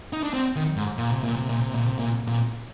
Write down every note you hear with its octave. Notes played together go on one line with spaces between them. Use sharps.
D#4
D4
C4
D#3
G#2
A#2
C3
A#2
C3
A#2
C3
A#2
C3
A#2
A#2